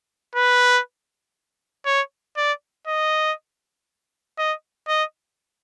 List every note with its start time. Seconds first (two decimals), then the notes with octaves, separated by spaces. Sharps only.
0.35 B4
1.86 C#5
2.37 D5
2.87 D#5
4.39 D#5
4.88 D#5